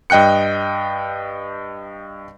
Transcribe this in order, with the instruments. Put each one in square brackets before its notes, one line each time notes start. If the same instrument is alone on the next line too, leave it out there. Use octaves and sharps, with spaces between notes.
[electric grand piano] G2 D#5 G5 F#6 C#7